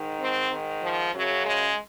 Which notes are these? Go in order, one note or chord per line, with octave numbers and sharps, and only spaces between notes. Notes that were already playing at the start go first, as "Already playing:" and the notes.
Already playing: G#2 D#3
C4
G#2 D#3
F3
F#2 C#3 F#3
G#3